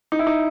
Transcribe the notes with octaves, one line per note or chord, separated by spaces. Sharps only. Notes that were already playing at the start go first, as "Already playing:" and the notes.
D#4
E4
D#4